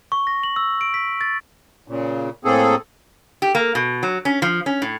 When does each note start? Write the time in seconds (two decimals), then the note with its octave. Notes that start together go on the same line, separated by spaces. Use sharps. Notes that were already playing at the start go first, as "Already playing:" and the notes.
0.12 C#6
0.27 A#6
0.43 F#7
0.56 E6
0.81 D7
0.94 B6
1.21 A6
1.88 A#2 C#3
2.45 A2 A#3 C4 G#4 A4
3.42 G4
3.55 A#3
3.75 B2
4.03 F#3
4.25 C#4
4.42 F3
4.66 C#4
4.82 A2